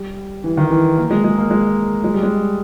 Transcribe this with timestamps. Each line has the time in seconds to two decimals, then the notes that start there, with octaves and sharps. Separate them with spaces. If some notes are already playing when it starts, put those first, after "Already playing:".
Already playing: G3
0.44 E3
0.57 D#3
0.71 E3
0.97 A#3
1.11 G#3
1.24 G#3
1.38 A#3
1.51 G#3
2.04 G#3
2.14 G3
2.23 G#3